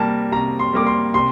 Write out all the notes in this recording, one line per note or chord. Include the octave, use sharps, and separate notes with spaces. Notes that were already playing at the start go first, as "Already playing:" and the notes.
Already playing: C3 G3 A#3 A5
C3 A#5
C6
G3 A#3 D6
C6
C3 C6